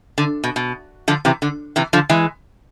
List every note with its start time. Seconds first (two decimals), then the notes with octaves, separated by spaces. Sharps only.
0.18 D3
0.44 B2
0.56 B2
1.08 D3 F3
1.25 C3 E3
1.42 D3
1.76 C3 E3
1.93 D3 F3
2.09 E3 G#3